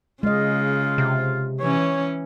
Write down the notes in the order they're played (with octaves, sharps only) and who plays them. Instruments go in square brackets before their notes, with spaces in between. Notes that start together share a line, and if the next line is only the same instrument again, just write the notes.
[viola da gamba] C#3 [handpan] G#3 D#5 [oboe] F4
[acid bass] C3
[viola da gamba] E3 C#4 [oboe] C#5